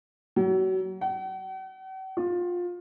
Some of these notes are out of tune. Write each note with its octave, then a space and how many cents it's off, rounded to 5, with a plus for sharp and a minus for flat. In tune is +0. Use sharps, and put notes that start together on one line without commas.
F#3 +30
F#5 +45
F4 +20